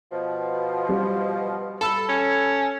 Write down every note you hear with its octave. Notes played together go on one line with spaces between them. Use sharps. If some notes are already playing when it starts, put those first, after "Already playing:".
B2 F3
G3
A4 B5 E6
C#4